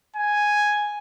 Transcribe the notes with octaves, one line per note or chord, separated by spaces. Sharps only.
G#5